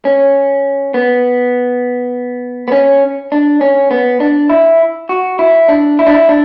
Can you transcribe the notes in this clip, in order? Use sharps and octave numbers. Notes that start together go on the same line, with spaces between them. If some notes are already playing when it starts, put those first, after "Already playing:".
C#4
B3
B3
C#4
D4
C#4
B3
D4
E4
F#4
E4
D4
E4
D4
E4
D4